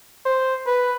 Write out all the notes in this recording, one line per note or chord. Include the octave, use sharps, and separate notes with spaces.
C5
B4